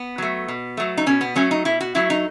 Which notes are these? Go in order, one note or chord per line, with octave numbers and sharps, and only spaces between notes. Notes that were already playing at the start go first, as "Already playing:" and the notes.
Already playing: B3
F#3 A3
B2
F#3 A3
D#4
B2 C#4
B3
F#3 A3 C#4
D#4
B2 E4
F#4
F#3 A3 E4
D#4